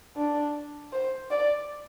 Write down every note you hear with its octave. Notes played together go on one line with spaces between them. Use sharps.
D4
C5
D5